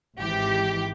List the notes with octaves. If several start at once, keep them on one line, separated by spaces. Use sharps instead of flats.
G#1 G#2 E3 G4